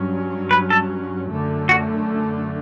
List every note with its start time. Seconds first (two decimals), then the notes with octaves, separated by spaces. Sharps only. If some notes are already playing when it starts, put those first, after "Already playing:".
Already playing: G2 F#3 C#4
0.51 B4
0.70 A4
1.30 F#2 D3 A3
1.69 F#4